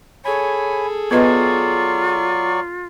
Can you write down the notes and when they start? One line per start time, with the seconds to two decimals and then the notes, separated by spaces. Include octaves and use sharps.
0.25 G#4 A4 C#5 G#5 B5
1.11 F#3 B3 F4 B4 D5 D#5 C#6